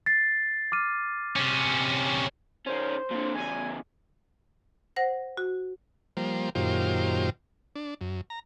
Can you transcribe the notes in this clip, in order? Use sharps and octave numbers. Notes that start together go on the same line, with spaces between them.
A6 C7
D6 F6 D#7
C3 C#4
D#3 C#4 C5
A#2 D3
E2 C#3 G#5
C5 F#5 A#6
F#4
F3 G3 A#3 C5
F#2 A#2 D#3 F4 G4 C5
D4
F#2
A#5